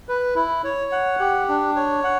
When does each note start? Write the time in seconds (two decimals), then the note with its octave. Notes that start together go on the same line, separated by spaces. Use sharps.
0.08 B4
0.36 E4
0.64 C#5
0.92 F#5
1.20 G4
1.49 D4
1.76 C#5
2.04 F#5